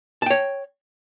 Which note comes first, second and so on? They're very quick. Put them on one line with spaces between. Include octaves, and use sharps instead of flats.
A5 G5 C#5